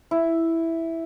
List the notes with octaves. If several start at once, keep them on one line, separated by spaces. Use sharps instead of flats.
E4